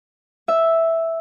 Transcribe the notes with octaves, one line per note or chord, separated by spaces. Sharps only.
E5